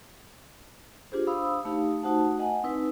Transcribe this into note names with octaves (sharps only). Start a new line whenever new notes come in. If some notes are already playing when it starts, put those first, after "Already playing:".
D4 F4 G4 G#4 C5
D4 C5 F5 B5 D#6 E6
A3 D#4 G4 F5
A3 D#4 F#4 C5 F#5 A5
D#5 F#5 G#5
C4 D#4 E4 B4